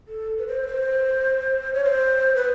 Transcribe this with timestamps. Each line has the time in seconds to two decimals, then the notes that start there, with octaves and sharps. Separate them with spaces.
0.08 A4
0.38 B4
0.47 C5
0.62 B4
0.67 C5
1.73 C#5
1.84 C5
2.35 B4